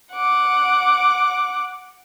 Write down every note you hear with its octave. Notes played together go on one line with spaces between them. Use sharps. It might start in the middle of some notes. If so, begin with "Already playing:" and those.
F#5 D6